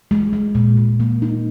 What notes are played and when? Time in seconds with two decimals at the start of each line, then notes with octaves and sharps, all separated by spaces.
0.11 G#3
0.33 G#3
0.55 A#2
0.77 A#2
1.00 A#3
1.22 D#4